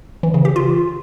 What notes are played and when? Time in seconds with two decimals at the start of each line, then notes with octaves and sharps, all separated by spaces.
0.23 E3
0.34 C#3
0.45 G4
0.56 F4